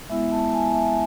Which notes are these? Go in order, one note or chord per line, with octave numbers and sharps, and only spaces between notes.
G#3 B3 E4 E5
A5
G#5
E5